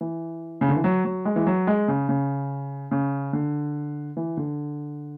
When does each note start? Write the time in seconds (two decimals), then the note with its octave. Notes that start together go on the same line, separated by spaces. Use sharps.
0.01 E3
0.61 C#3
0.69 D3
0.76 E3
0.84 F#3
1.05 F#3
1.25 G#3
1.36 E3
1.47 F#3
1.67 G#3
1.88 C#3
2.09 C#3
2.91 C#3
3.33 D3
4.17 E3
4.37 D3